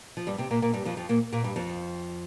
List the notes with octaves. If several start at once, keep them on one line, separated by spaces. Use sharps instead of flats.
F3
G2 G3
C3 C4
A#2 A#3
A#2 A#3
G2 G3
F2 F3
F2 F3
A#2 A#3
A#2 A#3
G2 G3
F2 F3